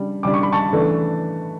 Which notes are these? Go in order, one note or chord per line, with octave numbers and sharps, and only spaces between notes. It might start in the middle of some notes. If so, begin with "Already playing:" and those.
Already playing: C#3 G3 D4
C#3 G3 D4 D6
C#6
B5
A5 C#6
C#3 E3 A3 D4